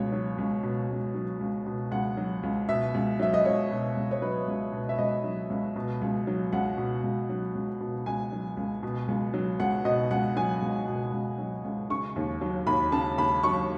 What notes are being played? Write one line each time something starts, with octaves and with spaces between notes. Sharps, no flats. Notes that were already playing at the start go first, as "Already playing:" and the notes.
Already playing: C#2 B2 C#5
F#3
C#2
B2
C#2
F#3
C#2
B2
C#2 F#5
F#3
C#2
B2 E5
C#2
F#3 E5
D#5
C#2 C#5
B2
C#2
C#5
F#3 B4
C#2
B2
E5
C#2 D#5
F#3
C#2
B2
C#2
F#3
C#2 F#5
B2
C#2
F#3
C#2
B2
C#2 G#5
F#3
C#2
B2
C#2
F#3
C#2 F#5
B2 D#5
C#2 F#5
F#3 G#5
C#2
B2
C#2
F#3
C#2
C#3 C#6
D#2
F#3
D#2 B5
C#3 A5
D#2 B5
F#3 C#6